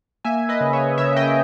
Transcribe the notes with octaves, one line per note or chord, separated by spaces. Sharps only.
A#3 E5 G#5
B4 D#5
C#3
C#5 E5
C#3 C#5 E5
D#5 G5